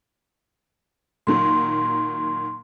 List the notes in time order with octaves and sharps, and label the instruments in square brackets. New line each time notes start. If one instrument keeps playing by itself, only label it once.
[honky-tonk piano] A#2 D#3 F#3 [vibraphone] C6